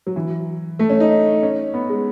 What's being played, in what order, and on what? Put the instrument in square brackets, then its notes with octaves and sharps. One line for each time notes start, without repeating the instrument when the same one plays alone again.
[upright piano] F#3
E3
A3
C#4
D#4
C#4
B3
G#3